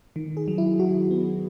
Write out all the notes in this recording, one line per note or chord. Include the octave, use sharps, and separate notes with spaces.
D#3
G#4
F#3
E4
D#3 F#4
B3